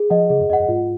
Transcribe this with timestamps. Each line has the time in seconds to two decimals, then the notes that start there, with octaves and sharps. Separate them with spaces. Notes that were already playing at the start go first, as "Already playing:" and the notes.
Already playing: G#4
0.10 F3 D#5 F#5
0.30 C#3 G#4
0.40 F#2
0.50 F2 D#5 F#5
0.59 F#2
0.68 G#2 F4